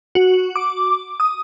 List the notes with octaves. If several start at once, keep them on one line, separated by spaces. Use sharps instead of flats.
F#4
D6
D#6